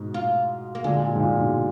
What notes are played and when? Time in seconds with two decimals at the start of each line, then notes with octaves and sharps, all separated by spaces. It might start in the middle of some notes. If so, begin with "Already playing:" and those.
Already playing: G#2 B2
0.14 F4
0.75 A#3
0.84 A#2 D3 G#3
1.03 A#2
1.15 G#2
1.20 A#2
1.37 G#2 B2